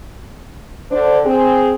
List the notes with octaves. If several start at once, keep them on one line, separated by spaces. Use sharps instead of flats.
D3 D4 C5
C4 G#4